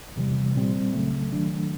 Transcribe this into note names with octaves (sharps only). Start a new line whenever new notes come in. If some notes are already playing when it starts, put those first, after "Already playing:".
E2 C3 E3 G3
A#2 G3 C4
C#2 C#3 F#3 A3
D#3 F#3 A3 D4